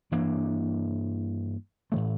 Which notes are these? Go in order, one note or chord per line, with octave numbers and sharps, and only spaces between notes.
G2 E3 A#3 D4
A2 E3 A3